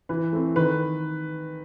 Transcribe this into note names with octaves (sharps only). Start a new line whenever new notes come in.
E3 B4
A3 C4
D#3 B4